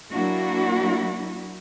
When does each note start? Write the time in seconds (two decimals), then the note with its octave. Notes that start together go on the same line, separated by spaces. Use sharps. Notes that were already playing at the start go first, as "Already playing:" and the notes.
0.13 F#3 A#3 D4 E4 F#4